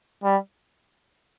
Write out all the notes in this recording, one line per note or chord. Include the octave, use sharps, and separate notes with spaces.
G3